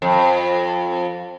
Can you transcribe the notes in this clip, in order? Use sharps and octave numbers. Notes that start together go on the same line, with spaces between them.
F2